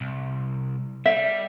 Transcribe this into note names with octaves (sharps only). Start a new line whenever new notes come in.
C2
G3 E5